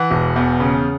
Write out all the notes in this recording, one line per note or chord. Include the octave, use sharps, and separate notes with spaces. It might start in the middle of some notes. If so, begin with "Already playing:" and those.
Already playing: E3 F#5
E1
E2
C#3